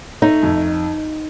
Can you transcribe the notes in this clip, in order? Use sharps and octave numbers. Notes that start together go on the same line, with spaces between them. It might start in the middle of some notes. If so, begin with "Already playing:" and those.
A3 D#4
F2